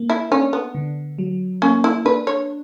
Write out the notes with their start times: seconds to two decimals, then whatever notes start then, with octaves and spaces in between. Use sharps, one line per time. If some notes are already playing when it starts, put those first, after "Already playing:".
Already playing: A#3
0.10 E4
0.31 C#4 D4
0.53 B3
0.75 D3
1.18 F#3
1.62 A#3 C#4
1.84 E4
2.05 D4 B4
2.27 C#5